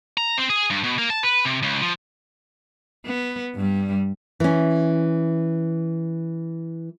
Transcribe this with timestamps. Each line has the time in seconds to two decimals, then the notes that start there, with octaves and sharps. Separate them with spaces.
0.17 A#5
0.38 C4
0.50 G#4
0.70 G2
0.84 B2
0.98 A#3
1.10 A5
1.23 B4
1.45 C3
1.63 C#2
1.82 F3
3.05 B3
3.55 G2 G3
4.40 E3 C#4